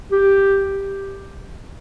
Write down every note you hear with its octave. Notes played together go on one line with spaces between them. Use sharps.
G4